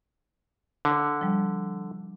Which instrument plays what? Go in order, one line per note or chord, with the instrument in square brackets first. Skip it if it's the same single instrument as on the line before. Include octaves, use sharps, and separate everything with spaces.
[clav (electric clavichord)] D3
[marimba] F3 G3